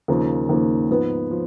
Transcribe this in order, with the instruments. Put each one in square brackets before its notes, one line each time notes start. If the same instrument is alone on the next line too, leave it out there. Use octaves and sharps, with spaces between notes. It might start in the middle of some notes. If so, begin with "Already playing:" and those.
[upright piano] D#2 C#3 F3 A#3
D#2 C#3 F3 A#3
G#2 F3 B3
F3